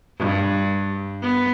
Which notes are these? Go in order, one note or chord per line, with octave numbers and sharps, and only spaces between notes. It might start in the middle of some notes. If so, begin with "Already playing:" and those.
G2
B3